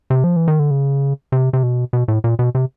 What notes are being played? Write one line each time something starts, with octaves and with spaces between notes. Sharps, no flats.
C3
F3
E3
D#3
D3
C#3
C3
C3
B2
B2
A2
A#2
B2
C3